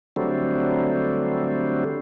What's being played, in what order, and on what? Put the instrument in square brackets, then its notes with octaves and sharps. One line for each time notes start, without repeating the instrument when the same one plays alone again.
[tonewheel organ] D3 F#3 G3 A3 C4